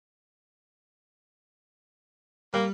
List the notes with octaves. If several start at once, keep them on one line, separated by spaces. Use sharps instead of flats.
G3 A#3